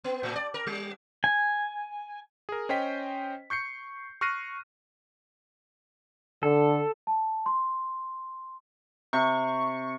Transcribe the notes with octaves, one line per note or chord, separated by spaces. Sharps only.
B3
A2
D5
A#4
G3
G#5
G#4 A#4
C#4 C5 D#5 G5 B6
C#6 G6 C7 C#7
C#6 F6 F#6 A#6 C7 D#7
D3 A4
A5
C6
C3 C#6